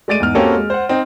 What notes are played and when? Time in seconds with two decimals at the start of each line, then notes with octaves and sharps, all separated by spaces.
0.08 G#3 A3 D5 A6 D7 D#7
0.20 E2 G#2 F6
0.35 A#3 C4 C#4 F#4 G4 A4
0.56 G#3
0.70 C5 F#5
0.89 C4 D#4